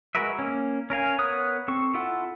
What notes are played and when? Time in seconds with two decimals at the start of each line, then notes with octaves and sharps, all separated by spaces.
0.15 G#3 F#4 A#4 B4 E5
0.39 A#3 C#4
0.90 C#4 A#4 F5 G#5
1.18 B3 A#4 C#5 D#6 F#6
1.68 C4 A4 C#6
1.94 E4 F4 A4 F#5